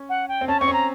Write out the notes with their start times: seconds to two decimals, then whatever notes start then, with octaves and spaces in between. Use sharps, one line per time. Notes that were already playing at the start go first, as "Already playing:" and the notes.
Already playing: C#4
0.09 F#5
0.28 G5
0.41 C4
0.48 C#4 A5
0.60 C4 C#6
0.68 C#4
0.73 A#5